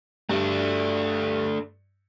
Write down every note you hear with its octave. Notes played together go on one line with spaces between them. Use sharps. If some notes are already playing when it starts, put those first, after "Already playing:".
G2 A3 D4